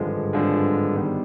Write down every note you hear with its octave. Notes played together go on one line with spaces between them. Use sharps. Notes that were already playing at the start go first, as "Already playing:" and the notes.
Already playing: G#1 G2 D3 F3 G#3
G#1 G2 D3 F3 G#3
D#3 G3 B3